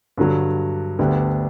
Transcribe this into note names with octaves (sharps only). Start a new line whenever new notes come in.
G2 D3 F#3
D2 D3 G3 B3 D4